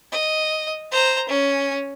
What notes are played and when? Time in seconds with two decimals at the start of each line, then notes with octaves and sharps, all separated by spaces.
0.12 D#5
0.91 C5 A#5
1.29 C#4